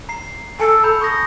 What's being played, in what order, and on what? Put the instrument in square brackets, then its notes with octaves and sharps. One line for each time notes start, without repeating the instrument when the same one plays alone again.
[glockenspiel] A#5 C7
[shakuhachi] A4 [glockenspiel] G#5 A5 C#7
[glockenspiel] A#5 B5 G6
[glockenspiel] C#6 G6 A#6 [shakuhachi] D#6